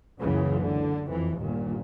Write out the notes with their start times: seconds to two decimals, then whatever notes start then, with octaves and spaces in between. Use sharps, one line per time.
0.19 F#1 C#2 F#2 C#3 E3
0.62 D3
1.07 F2 E3
1.39 G1 D#2 A#2